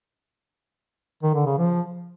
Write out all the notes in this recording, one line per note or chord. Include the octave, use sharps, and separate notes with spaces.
D#3
D3
C#3
F3